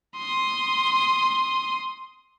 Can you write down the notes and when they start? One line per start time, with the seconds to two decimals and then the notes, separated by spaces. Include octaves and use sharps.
0.17 C6 D#6